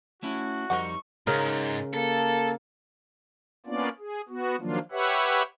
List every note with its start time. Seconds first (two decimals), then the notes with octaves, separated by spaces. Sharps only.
0.23 A3 C#4 E4 F#4
0.70 F2 G3 D#4 A#4 C5 F#5 C#6
1.27 G#2 C#3 A#4
1.94 A#3 A4
3.66 A#3 B3 C#4 D4 F4 D5
3.99 G#4
4.29 B3 F#4
4.60 D#3 F3 F#3 A#3 D4 F4
4.91 G4 B4 C#5 E5 F#5